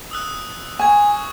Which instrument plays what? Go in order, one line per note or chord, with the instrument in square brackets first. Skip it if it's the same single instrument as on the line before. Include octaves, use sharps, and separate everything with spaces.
[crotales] D#6 E6 F#6
[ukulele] G#5 [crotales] C#6 G#6